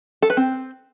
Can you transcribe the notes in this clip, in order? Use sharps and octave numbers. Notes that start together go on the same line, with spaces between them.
A4
B4
C4